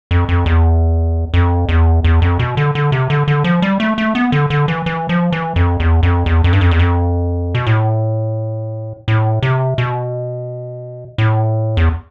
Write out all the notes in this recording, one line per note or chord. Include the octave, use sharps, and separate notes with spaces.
F2
F2
E2
F2
E2
E2
F2
B2
D3
D3
C3
D3
D3
F3
G3
A3
A3
B3
D3
D3
E3
E3
F3
E3
F2
E2
F2
E2
F2
G2
F2
E2
F2
B2
A2
A2
C3
B2
A2
E2